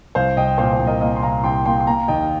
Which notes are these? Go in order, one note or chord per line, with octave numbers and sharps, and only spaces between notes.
C2 C5 F5
C2 D#5 G5
A#2 C5 F5
C5
C2
A#4 D#5
A#3 A#4 D#5
C6
C2 F5 A#5
C2 G5 C6
A#3 G5 C6
C6
A#3 F5 A#5
D#2 D#5 G5